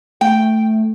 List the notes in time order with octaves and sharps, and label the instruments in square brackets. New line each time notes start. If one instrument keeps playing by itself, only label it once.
[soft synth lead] A3 [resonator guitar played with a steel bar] G5